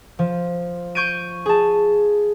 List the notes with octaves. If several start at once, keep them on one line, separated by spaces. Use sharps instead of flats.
F3
C#6 G6 G#6 D7 D#7
G#4 A5